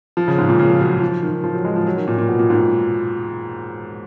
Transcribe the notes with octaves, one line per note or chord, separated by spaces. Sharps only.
F3
C#3
G#2
A#2
C#3
F3
F#3
F3
D#3
F3
F#3
G#3
F3
F#3
D#3
A#2
A#2
B2
A#2
G#2